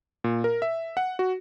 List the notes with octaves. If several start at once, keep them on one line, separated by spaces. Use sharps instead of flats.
A#2
A#4
E5
F#5
F#4